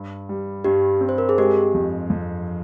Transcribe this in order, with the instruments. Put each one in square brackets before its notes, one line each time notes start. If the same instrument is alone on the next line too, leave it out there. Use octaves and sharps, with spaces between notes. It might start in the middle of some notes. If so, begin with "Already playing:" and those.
Already playing: [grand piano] G2
G3
[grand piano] G2 [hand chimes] G4
[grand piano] C4
[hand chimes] C5
A#4
G#4
[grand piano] G#3 [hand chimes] G4
[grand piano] F2
F2